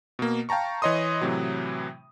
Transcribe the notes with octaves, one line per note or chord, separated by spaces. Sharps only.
B2 A#3
F5 G5 A5 A#5 C#6
E3 C#5 D#5 C6 D#6
A2 C3 E3 F#3